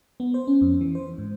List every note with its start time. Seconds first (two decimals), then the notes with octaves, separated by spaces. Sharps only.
0.20 B3
0.34 C5
0.47 C#4
0.61 F2
0.81 E3
0.95 C5
1.18 G#2